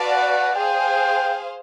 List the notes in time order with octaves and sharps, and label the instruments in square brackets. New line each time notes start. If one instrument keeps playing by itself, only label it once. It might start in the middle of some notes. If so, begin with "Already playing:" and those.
Already playing: [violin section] F#4 B4 D5 F5 A5
[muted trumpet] F#5
[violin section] G#4 C5 F5 [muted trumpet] G5